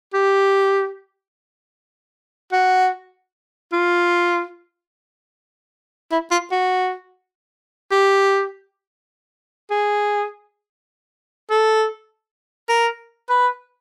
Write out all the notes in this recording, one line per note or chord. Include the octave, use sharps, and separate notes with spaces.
G4
F#4
F4
E4
F4
F#4
G4
G#4
A4
A#4
B4